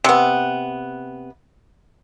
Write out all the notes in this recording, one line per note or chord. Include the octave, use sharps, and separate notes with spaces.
C3 B3